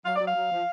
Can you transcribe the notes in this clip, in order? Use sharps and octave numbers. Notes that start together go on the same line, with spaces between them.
F#3 F5
F#3 D5
F5
F#3
F3